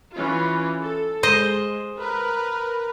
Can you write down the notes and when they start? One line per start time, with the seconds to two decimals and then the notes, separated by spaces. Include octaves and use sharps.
0.13 E3 C#4 F4
0.81 A4
1.23 G#3 C5 D#5
2.00 A#4 B4